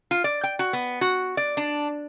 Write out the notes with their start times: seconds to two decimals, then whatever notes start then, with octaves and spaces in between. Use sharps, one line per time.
0.11 F4
0.24 D5
0.43 G5
0.59 F#4
0.73 B3
1.01 F#4
1.37 D5
1.57 D4